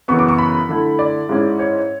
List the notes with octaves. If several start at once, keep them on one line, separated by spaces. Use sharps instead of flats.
F#2 C#3 E3 B3 C#6
D6
C#6
B5
D3 A3 E4
D5
G#2 G#3 C#4 E4
C#5